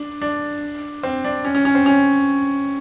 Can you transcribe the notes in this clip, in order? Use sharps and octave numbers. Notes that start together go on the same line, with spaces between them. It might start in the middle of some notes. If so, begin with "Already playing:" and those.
Already playing: D4
D4
C4
D4
C#4
C#4
C#4
C4
C#4